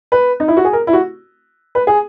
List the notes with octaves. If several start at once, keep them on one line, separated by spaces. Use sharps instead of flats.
B4
D#4
E4
F#4
G#4
A#4
E4
F#4
B4
G#4